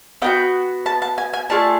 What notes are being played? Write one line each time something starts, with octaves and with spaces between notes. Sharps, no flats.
B3 D#4 F#4 G5
A5
A5
G#5
G#5
A3 D4 F4 G#4 A5